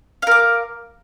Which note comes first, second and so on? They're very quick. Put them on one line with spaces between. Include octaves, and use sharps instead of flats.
F5 A#4 D6